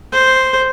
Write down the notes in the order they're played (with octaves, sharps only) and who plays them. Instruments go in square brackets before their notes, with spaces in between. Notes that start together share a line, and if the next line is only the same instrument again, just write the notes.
[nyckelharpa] C5